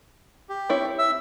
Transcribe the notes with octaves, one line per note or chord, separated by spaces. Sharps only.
G4
C4 E4 C#5
E5 E6